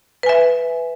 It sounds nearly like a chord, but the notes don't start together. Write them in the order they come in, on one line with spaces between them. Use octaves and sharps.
B4 G#5 E5